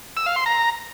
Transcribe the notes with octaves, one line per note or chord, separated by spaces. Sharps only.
E6
F5
C6
A#5